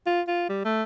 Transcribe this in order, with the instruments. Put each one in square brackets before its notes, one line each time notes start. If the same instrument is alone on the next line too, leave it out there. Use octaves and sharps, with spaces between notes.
[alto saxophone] F4
F4
G3
A3